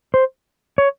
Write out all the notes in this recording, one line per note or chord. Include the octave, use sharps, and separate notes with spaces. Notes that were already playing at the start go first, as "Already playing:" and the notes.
C5
C#5